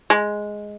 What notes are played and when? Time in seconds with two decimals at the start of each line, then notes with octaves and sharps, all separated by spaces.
0.10 G#3